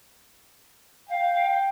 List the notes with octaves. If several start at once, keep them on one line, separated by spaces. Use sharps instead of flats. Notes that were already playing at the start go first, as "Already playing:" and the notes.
F5 G5